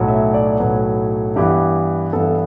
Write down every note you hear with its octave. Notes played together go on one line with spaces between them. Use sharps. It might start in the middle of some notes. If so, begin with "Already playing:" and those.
Already playing: B1 A2 F#3
E5
D5
B1 A2 F#3 B4
G2 E3 B3 G4
G2 E3 B3 A4